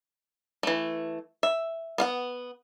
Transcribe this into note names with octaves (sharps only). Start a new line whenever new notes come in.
E3 A3
E5
B3 F5 F#5